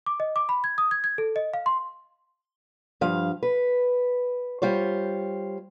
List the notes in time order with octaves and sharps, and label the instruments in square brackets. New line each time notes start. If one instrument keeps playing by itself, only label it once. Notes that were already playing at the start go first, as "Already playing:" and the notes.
[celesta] D6
D#5
D6
B5
G#6
D#6
G#6
G#6
A4
D#5
F5
C6
[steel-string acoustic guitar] G2 F3 F5
B4
G3 F4 C5 C#5